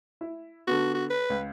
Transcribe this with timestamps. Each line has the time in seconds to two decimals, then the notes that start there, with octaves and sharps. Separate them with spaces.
0.21 E4
0.67 D3 B3 F#4
0.94 F#4
1.10 B4
1.30 C#2